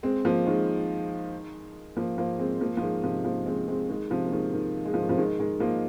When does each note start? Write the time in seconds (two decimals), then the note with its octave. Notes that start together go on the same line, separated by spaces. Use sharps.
0.03 G#3 C4
0.25 F3 A#3
0.46 D#3 G#3
1.97 F3 A#3
2.18 F3 A#3
2.39 G#3 C4
2.61 F3 A#3
2.77 F3
2.82 D#3 G#3
3.04 C3 F3
3.24 F3 A#3
3.46 G#3 C4
3.68 G#3 C4
3.89 D#3 G#3
4.10 C3 F3
4.26 A#3
4.32 D#3 G#3
4.53 D#3
4.85 G#3
4.94 F3
5.02 D#3
5.09 C3 F3
5.17 D#3 G#3
5.39 D#3 G#3
5.60 F3 A#3